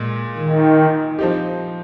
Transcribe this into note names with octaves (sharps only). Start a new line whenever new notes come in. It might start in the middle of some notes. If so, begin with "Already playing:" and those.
Already playing: A#2 G#3
D#3
F3 C4 D#4 G4